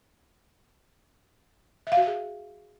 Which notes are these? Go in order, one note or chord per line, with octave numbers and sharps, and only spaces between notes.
E5
F5
F#4
F5
G#4